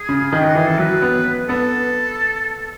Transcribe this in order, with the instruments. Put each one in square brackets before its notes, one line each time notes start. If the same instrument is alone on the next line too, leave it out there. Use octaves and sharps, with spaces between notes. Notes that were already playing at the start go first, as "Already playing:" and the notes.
Already playing: [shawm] G#4
[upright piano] C#3
D#3
[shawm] F#4
[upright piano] E3 [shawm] G#4
[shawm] A4
[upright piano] F#3 [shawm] B4
[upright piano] B3
[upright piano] B3 [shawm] A4